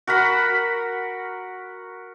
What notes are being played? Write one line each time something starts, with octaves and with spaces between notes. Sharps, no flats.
F#4 A#4 F#5 B5